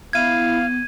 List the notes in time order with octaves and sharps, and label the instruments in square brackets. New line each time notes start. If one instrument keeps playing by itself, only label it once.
[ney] B3 [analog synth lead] E4 [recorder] F5 [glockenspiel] G#6 D#7